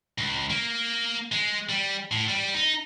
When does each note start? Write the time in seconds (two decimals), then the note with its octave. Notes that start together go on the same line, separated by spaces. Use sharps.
0.18 C#2
0.50 A#3
1.32 G#3
1.69 G3
2.11 A2
2.28 G3
2.54 D#4